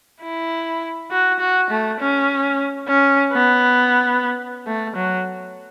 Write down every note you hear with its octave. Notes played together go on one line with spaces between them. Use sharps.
E4
F#4
F#4
A3
C#4
C#4
B3
A3
F#3